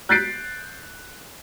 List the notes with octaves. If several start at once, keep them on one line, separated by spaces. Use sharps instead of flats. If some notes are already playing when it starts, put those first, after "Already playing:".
F#6 G6 A6 B6 C7 D7